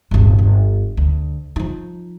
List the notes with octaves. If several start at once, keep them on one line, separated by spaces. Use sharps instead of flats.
D1 G1
G1
D2
F3 D#4